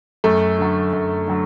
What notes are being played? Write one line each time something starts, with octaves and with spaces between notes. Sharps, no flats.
F#2 A3
D3 F#3
F#2
D3 F#3